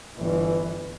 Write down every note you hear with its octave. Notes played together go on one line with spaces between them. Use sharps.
G1 E3